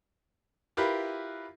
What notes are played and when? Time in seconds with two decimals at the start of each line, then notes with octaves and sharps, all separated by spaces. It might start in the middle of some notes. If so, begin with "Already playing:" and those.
0.77 E4 F4 G4 A#4 B4